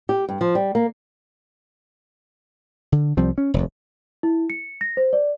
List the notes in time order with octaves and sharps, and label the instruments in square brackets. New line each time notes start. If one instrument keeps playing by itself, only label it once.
[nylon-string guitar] G4
G2
F3
G3
A#3
[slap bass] D3
C2 F3 G3 C4
C#4
F1 D#2
[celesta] E4
C#7
A#6
C5
D5